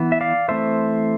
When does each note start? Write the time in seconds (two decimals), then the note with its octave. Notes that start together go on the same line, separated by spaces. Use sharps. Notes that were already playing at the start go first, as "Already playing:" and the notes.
Already playing: E3 B3
0.12 E5
0.21 D5 F5
0.48 E3 A3 C4 C5 E5